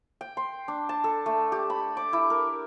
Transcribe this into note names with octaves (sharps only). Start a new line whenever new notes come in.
G5
C6
D4
A5
A4
A3
G4
B5
D6
E4
A#4